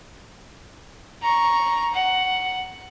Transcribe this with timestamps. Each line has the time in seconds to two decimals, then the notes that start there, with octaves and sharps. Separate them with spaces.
1.22 A#5 C#6
1.94 F#5